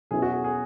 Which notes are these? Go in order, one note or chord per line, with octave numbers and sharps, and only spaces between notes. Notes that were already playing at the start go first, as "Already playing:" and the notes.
B2 F#3 C#4 E4 G#4
F#4
G#4
G#4